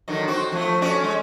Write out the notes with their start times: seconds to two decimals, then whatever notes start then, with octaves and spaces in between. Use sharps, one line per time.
0.08 D3 D#3 F#3
0.27 C4 F#4
0.52 F3 A3
0.82 C#4 F#4 D5
1.00 G#3 C#4